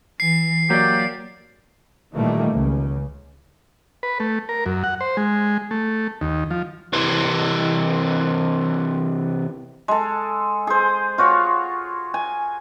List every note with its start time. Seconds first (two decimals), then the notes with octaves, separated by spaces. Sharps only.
0.20 E3 C7
0.70 F#3 A#3 G4 D5
2.14 A#2 D#3 E3 G3 A3 A#3
2.50 C#2 C#3
4.03 B4
4.20 A3
4.49 A#4
4.66 F#2
4.84 F#5
5.01 C5
5.17 G#3
5.71 A3
6.21 D#2
6.51 F3
6.93 C3 E3
9.88 G#3 A4
10.67 G#4 C5
11.18 F4 F#4 C#5
12.14 G#5